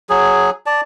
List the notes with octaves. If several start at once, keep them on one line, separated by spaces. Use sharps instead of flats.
F#3 G#4
D5 A5